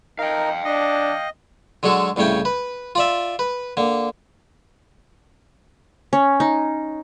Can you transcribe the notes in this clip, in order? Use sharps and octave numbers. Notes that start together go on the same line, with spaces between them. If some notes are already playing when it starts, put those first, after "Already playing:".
D#4 A#4 F5 G5
D4 D#5
D3 F#3 G#3 F#4 A4
C2 A2 C#3 C#4 G5
B4
F4 D5 E5
B4
D3 A#3
C#4
D#4